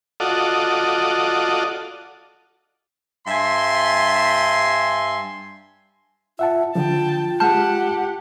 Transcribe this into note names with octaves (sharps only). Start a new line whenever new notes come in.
F4 F#4 A4 D5 D#5
G2 E5 G#5 C6
F4 E5 F#5 A5
D3 F3 F4 G5 A5
G#3 G4 F#5 A5 F6 G6